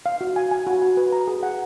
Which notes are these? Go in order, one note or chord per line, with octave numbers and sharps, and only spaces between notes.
F5
F#4
G#5
G#5
F#4
F#4
B4
A#5
G#4
F#5